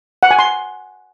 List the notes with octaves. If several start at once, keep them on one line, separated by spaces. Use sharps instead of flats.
F#5
G#5
C6